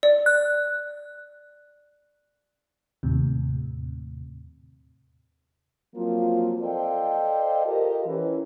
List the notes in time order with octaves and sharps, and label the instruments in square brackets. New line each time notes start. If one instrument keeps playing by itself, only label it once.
[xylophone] D5
[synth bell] F#6
[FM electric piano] D#2 A2 C3
[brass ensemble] F3 F#3 A#3 C4 F4
A4 C5 D5 D#5 F5 G5
F4 G4 A4 A#4 D#5
E3 C#4